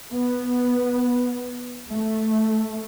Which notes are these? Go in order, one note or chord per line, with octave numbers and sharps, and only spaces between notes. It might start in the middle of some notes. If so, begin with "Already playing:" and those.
B3
A3